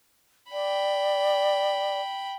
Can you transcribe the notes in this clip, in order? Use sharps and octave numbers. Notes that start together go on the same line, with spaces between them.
D5 G5 B5